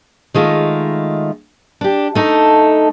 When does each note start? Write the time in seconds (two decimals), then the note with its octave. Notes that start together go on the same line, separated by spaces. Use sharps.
0.34 D#3 G#3 A3 F4
1.81 D4 G4
2.15 A3 D#4 A4